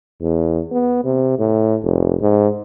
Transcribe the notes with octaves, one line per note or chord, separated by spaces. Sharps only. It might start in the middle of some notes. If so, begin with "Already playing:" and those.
E2
B3
C3
A2
F1
G#2